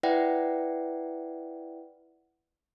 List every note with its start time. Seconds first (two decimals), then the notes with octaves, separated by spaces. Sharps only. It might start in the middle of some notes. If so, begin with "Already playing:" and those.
0.03 E4 B4 D5 E5 F#5 G5